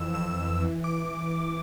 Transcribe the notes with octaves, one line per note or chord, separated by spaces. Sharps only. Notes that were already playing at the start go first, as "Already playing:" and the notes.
Already playing: F2 E3 E6
F2 E6
E3
D6